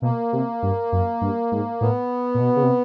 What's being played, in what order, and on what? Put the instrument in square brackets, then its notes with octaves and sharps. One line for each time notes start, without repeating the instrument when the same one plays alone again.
[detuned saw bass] B2 [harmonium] A#3
[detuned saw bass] C3
G2
F#2
G2
G#2
[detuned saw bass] A2 [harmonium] B3
[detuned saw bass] A#2
B2
C#3
C3